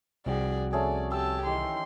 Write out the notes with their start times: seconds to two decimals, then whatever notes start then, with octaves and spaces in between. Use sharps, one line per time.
0.26 C2 F2 F#4 G#4 D5 G5
0.73 A3 C#4 G#4 D5
1.11 G4 A5 E6
1.46 D#3 E3 D#4 G4 C6